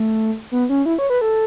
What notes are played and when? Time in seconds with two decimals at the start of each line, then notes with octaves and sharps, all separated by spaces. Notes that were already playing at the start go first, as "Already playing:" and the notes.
Already playing: A3
0.52 B3
0.69 C#4
0.86 E4
0.99 C#5
1.10 B4
1.21 A4